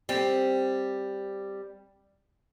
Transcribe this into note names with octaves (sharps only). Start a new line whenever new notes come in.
G3 C4